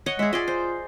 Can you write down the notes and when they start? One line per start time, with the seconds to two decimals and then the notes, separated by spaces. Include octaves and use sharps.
0.06 C#5 D#5 F#5
0.19 G#3 G#4 E5
0.33 F4 G#4 D5 D#5
0.48 C5